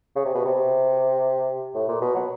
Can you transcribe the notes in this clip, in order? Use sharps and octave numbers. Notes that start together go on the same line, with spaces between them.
C#3
C3
B2
C3
A2
A#2
B2
F#3